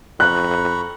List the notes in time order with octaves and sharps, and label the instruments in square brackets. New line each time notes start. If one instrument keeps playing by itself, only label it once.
[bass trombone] F2 [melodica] A#5 B5 C#6 [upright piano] F#6